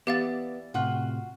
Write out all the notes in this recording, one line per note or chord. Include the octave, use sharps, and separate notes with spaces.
E3 B3 G4 D5 E5 F5 A6
A2 C3 F4 F#4 F#5